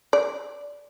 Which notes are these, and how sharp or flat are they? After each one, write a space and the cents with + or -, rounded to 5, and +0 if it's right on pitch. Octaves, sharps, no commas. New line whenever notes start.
D5 -15